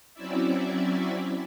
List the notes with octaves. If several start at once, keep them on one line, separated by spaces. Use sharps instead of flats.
F#3 C4 C#4 E4 D5 E5